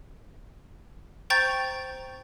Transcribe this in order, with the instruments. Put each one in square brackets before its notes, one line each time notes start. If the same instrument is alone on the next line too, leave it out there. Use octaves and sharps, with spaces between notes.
[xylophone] C5 G5 A#5 C#6 G6 A6